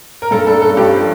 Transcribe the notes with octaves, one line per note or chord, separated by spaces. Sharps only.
A#4
G2 A4
G2 A4
C#4 A4
G2 G4
F3